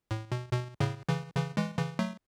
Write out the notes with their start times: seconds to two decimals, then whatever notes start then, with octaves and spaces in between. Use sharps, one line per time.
0.11 A2
0.32 B2
0.53 B2
0.80 A2 C#3
1.08 C#3 E3
1.36 C#3 E3
1.57 E3 G#3
1.78 C#3 E3
1.99 F#3 A3